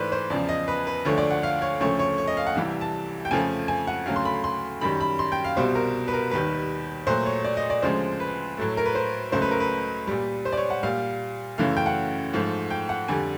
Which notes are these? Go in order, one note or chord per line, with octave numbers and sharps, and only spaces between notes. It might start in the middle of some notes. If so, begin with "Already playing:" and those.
Already playing: G#2 E3 A3 B4 C5 D5
C5
E2 C#3 F3 D5
D#5
B4
B4
D2 D3 F3 A3 C#5
D5
F#5
F5
C#5
D2 C#3 F3 A3 C#5
C#5
C#5
D#5
F5
F#5
C2 C3 E3 G3
A5
G5
F2 C#3 F3 A3 G#5
G#5
F#5
D2 C#3 F#3 A3 F5
C6
B5
C6
F#2 D#3 G3 B5
B5
C6
G5
F5
C2 B2 G3 C5
A#4
B4
A#4
D#2 D#3 G3 B4
A#2 F#3 A3 C5
C#5
D5
D#5
D5
D2 C#3 F3 G#3 C5
B4
A2 F#3 A3
A#4
B4
C5
C#2 C#3 F#3 A3 C5
B4
A#4
B4
A#2 G3
C5
D5
C#5
F#5
A#2 G3 F5
F#2 C#3 E3 A3 F5
G5
F#5
G#2 F3 A3
G5
F#5
F2 D3 G3 G#5